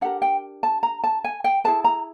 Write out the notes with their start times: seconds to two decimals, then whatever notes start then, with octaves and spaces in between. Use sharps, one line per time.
0.01 D4 G4 A#4 F#5
0.22 G5
0.63 A5
0.83 A#5
1.04 A5
1.24 G#5
1.44 G5
1.64 E4 G#4 B4 A5
1.84 A#5